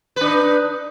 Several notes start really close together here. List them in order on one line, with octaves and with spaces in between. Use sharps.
B4 D4 D#4